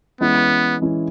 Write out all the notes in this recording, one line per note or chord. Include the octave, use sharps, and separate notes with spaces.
E3 G#3 B3 C#4 E4
E3 G#3 C#4 E4